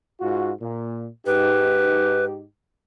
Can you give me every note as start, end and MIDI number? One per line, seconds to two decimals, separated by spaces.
0.20 0.51 44
0.20 0.51 65
0.20 0.51 66
0.61 1.07 46
1.26 2.44 44
1.26 2.44 63
1.26 2.44 67
1.26 2.25 71